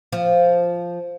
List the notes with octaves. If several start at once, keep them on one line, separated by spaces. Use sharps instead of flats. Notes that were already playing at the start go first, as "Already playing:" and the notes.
F3